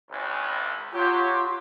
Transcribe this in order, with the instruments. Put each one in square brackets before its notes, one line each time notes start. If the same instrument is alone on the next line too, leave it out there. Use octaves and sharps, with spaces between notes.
[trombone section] G#1 C#2
[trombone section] F#3 G4 [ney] F4